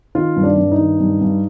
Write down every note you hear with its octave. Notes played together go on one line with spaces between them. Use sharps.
D#3 F4
G2
D4
G2
D#4
D#3
G2
G2